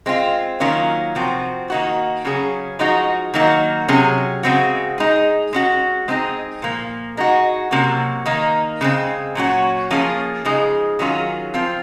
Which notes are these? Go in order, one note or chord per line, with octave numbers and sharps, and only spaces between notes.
G#3 C4 F4
D#3 F#3 A#3 C#4 F4
C3 F3 C4 F#4
D#3 A#3 D#4 F#4
C#3 F#3 C#4 G#4
F3 G#3 D#4 F#4
D#3 F#3 A#3 D#4 F#4
C3 F#3 C#4 G#4
C#3 G#3 C4 F#4
G#3 D#4 G#4
G#3 C#4 F#4
G#3 C4 D#4 G#4
A#2 F3 A#3
G#3 D#4 F#4
C3 F#3 A#3 C#4 F#4
D#3 A#3 D#4
C#3 G#3 C4
A#2 F#3 C#4 F#4
F3 A#3 C#4 F4 G#4
C#3 F3 G#3 D#4 G#4
D#3 F#3 C#4 F4 G#4
F3 C4 F4